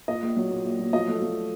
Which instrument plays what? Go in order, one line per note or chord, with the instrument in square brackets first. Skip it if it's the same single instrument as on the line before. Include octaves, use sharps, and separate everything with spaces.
[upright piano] A#2 D#5
A#1
F#3
A#2
A#1
F#3
F3 D#5
A3
F3